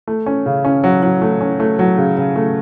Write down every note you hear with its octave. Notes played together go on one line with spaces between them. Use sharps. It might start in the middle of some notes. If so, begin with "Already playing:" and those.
A3
C#4
C#3
C#4
F#3
F#3
A3
C#4
A3
F#3
C#3
C#3
A3